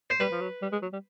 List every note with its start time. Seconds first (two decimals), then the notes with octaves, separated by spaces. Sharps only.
0.10 C5
0.20 G3 B4
0.32 F3
0.41 F#3
0.62 G3
0.72 G#3
0.82 F#3
0.93 G3